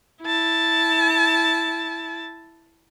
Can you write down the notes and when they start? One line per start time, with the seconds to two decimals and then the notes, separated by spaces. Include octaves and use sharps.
0.22 E4 A5